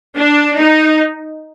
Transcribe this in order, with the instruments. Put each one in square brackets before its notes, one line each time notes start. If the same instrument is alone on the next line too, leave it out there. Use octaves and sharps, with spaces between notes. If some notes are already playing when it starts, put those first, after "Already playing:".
[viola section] D4
D#4